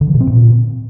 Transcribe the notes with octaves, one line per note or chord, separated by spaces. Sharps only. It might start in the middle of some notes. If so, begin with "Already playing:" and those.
D3
F3
B2
C4
A#2